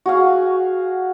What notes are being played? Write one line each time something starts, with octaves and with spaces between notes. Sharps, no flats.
F#4 G#4 F5